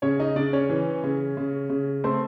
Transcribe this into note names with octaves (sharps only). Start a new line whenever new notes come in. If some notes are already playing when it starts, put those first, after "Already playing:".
C#3 C#4 C#5
D#4 D#5
C#3 D4 D5
C#4 C#5
E3
C#3
C#3
C#3
A3 C4 C5